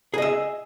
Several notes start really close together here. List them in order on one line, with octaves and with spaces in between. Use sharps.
G#4 D#5 E5